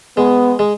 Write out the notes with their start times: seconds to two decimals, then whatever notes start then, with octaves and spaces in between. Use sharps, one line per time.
0.17 G#3 B3
0.59 G#3